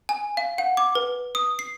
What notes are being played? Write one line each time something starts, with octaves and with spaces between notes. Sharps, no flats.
G#5
F5
F#5
D6
B4
D#6
C7